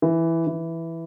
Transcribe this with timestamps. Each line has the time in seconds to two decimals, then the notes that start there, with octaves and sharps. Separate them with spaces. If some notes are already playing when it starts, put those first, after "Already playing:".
0.02 E3
0.47 E3